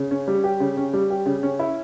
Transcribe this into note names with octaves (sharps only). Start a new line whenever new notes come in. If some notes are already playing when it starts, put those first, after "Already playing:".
Already playing: C#3
C#4
G3
G4
C#3
C#4
G3
G4
C#3
C#4
E4